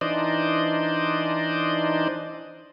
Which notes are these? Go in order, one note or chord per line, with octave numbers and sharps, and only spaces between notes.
E3 D4 D#4 C5 D5 D#5